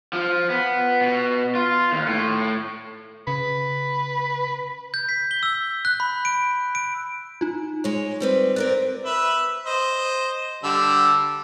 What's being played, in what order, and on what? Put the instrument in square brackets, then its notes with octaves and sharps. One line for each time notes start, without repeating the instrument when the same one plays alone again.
[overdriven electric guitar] F3
B3
B2
F4
D#2
A2
[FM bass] C#3 [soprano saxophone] B4
[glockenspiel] G6
B6
G7
E6
F#6
B5
D7
D7
[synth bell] D#4 F4
[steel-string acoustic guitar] G#3 C#5
G3 C4 B4
[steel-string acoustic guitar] C4 A#4 D5 [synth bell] F#6
[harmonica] B4 E5
C5 D#5
D3 G3 E6